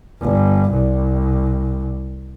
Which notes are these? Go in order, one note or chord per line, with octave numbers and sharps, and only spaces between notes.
G1
C2